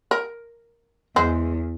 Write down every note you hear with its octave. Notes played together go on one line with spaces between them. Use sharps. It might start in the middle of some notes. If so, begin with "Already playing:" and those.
A#4
E2 G#3 C5